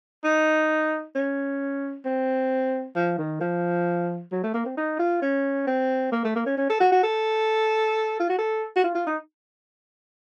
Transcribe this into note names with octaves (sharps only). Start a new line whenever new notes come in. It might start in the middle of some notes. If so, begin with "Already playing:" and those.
D#4
C#4
C4
F3
D#3
F3
F#3
A3
A#3
C4
D#4
F4
C#4
C4
A#3
A3
A#3
C#4
C#4
A4
F#4
F#4
A4
F4
F#4
A4
F#4
F4
F4
D#4